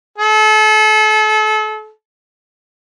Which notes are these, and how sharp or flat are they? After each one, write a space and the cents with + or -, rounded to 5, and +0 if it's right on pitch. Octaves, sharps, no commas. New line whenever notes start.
A4 -35